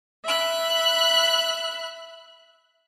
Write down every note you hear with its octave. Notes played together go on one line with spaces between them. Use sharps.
E5 B5 F#6